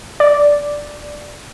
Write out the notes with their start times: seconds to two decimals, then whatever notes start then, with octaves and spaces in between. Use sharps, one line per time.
0.20 D5